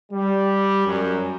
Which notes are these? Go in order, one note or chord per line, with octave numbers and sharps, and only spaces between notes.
G3
F#2